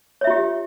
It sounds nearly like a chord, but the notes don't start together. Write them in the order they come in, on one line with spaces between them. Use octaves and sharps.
C#5 E5 F4 G4